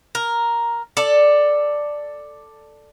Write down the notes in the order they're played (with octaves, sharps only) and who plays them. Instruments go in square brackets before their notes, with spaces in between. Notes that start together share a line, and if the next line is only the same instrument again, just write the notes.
[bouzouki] A#4
A4 D5